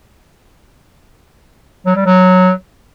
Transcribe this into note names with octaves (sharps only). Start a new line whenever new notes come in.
F#3
G3
F#3